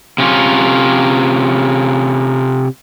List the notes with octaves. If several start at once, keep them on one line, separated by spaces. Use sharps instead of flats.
C3 C#4 F4